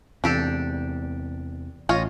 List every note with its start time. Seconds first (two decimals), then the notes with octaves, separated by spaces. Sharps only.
0.24 E2 C3 D4 G4 A4
1.89 A1 F4 C#5 D#5